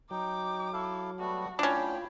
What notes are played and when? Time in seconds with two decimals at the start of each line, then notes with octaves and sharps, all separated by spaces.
0.11 F#3 D#4 G5 D6
0.73 E4 A4 F5
1.20 G3 A3 B3 F#4
1.59 A2 C#4 D4 F4 G5 B5